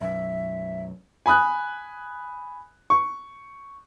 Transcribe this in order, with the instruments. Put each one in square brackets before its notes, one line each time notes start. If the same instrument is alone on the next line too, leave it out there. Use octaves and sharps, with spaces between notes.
[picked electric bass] B1 F#2 [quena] E5
[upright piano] G#5 B5 D#6 F#6
C#6